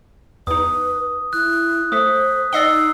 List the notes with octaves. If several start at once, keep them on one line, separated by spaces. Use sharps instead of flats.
E2 D#4 B4 D#6
E4 F#6
A3 A4 C5 D#6 B6
D#4 D5 D#5 F#5 E6 C7 G7